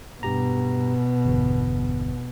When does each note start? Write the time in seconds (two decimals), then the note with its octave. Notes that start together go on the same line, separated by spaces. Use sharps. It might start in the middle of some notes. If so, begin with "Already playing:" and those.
0.23 G2 B2 G4 A#5
1.25 G1 E2